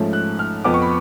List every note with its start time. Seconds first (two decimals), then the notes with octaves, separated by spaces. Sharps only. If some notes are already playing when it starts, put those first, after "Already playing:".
Already playing: G#2 F3 A3 C#4
0.13 F#6
0.39 F6
0.64 F2 F3 B3 D6
0.74 C#6
0.82 B5